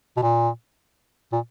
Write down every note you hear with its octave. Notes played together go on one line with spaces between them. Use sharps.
B2
A#2
A#2